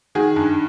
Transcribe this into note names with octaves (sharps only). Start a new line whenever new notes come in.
D#3 F#4 G#4
G2